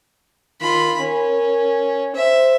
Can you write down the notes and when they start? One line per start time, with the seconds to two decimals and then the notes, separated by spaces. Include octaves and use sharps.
0.61 D#3 F4 B5
1.00 C#4 A#4
2.15 C5 E5